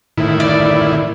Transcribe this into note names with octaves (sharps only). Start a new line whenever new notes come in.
A2 D#3 E4
D5